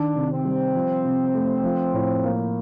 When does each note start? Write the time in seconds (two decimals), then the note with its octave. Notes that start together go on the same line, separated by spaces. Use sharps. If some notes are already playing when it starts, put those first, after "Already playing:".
Already playing: D#3 D4
0.16 C3
0.31 C4
0.45 G3
0.74 F3
1.04 C3
1.34 A3
1.64 F3
1.94 A2
2.24 A#3